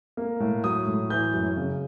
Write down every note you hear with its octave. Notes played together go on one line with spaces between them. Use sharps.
A#3
A2
F#3 D#6
A2
E3 G6
F#2
C#3